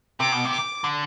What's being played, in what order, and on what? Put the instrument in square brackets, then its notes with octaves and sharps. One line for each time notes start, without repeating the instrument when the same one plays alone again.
[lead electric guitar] C3 [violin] D6
[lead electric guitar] B2
C3
[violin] D6
[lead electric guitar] D3